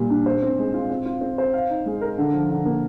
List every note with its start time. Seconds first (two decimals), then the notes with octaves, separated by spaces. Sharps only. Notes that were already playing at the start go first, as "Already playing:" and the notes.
Already playing: A#2 G3
0.10 D4
0.26 C5
0.42 C4
0.58 G#3
0.74 F4
0.90 C4
1.05 F4
1.21 C4
1.38 C5
1.54 F5
1.70 D#4
1.86 G#3
2.02 A#4
2.18 D3
2.34 F3
2.50 D3
2.65 A#3